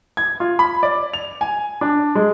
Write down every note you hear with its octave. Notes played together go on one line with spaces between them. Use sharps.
G#6
F4
B5
D5
F7
G#5
D4
G#3